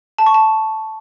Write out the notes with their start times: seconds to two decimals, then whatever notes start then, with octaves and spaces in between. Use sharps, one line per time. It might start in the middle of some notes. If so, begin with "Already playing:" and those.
0.19 A5
0.26 C#6
0.34 A5